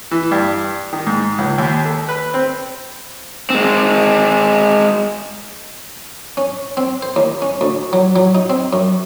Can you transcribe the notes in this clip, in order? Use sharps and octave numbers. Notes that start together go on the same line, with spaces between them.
E3
G2
D#3
G#2
C#2
D#2
A4
B4
C4
G#3 C4
C#4
C4
C5
D#2
C#4
D2
F#3
F#3
D#4
C4
F#2